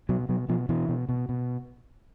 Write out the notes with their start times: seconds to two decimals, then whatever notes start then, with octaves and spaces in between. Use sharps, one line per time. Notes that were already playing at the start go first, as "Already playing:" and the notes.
0.09 B2 F#3
0.29 B2 F#3
0.49 B2 F3
0.69 B2 E3
0.89 B2
1.09 B2
1.29 B2